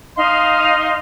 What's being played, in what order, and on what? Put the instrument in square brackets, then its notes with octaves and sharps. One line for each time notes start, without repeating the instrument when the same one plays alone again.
[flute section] D#4 D#5 F5 C6